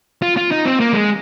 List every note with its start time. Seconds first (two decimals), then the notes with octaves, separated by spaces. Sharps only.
0.22 F4
0.37 F4
0.51 D#4
0.65 C4
0.80 A#3
0.93 G#3